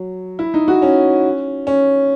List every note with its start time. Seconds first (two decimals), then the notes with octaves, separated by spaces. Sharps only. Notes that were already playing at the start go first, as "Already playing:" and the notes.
Already playing: F#3
0.39 E4
0.54 D#4
0.68 F#4
0.82 C#4
1.67 C#4